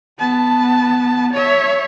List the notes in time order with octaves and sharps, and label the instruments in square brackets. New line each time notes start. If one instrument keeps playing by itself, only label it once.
[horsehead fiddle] B3 A5
C#5 E5